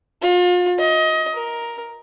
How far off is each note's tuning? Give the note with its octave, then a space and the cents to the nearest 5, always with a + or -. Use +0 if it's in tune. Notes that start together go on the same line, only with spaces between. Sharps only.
F4 +40
D#5 +25
A#4 +10